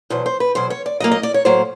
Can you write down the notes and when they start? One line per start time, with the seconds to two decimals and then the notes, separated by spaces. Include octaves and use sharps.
0.10 E2 B2 F#3 C5
0.26 C5
0.40 B4
0.55 E2 B2 F#3 C5
0.70 C#5
0.86 D5
1.00 A2 F#3 A#3 D#5
1.11 D#5
1.23 D5
1.34 C#5
1.45 A2 F#3 A#3 C5